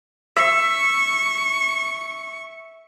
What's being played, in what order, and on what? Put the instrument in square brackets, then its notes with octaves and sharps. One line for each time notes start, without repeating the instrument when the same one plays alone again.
[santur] E5 [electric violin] C#6